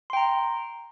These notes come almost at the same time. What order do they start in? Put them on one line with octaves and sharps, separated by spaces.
C6 G5 A#5